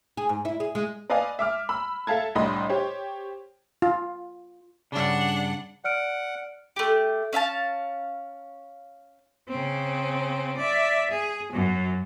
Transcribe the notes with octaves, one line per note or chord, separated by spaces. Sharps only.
G#4
G#2
E4
G#4
G#3
B4 D5 D#5 F5 G#5
E5 D6 F6
B5 E6
A4 E5 F5 A5 G#6
C2 A2 D4 D#5 B5 C6
G4 C5 C#5
F4
G2 C#3 D4 F#5
D5 F#5 F6 D7
A3 G4
C#4 E5 F5 A5
C#3 C4
D5 E5
G#4
F#2 F#3